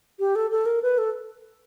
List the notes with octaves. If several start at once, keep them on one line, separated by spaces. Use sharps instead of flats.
G4
A4
A4
A#4
B4
A4